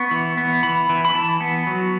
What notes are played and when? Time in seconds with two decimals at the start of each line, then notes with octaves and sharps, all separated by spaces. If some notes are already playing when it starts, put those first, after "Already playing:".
Already playing: B3 C#6
0.11 E3
0.37 B3
0.63 E3 B5
0.89 E3
1.05 B5
1.15 E3 A5
1.41 B3
1.67 F#3